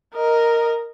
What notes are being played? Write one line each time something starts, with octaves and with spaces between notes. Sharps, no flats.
A#4 D#5